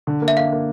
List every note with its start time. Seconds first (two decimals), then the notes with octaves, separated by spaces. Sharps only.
0.07 D3
0.22 A#3
0.28 E5
0.37 A#3 F5
0.52 A#3